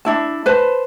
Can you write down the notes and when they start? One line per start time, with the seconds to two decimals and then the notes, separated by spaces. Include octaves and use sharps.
0.05 D4 E4 A5
0.46 B4 C5 A5